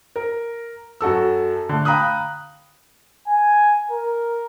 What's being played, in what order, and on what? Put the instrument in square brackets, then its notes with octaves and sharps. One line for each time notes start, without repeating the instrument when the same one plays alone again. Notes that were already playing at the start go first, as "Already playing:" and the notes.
[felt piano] A#4
F#2 F#4 A4 E6
D3 A3
F5 G5 A#5 B5 D#6 F#6
[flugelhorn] G#5
A#4